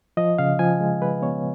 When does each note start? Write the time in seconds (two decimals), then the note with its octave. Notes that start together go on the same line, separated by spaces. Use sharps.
0.17 F3 D#5
0.38 C#3 F5
0.59 F3 G#5
0.81 G#3
1.01 G#3 B4
1.22 B3 C#5